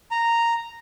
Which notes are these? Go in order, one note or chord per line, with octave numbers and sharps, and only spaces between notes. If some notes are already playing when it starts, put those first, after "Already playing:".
A#5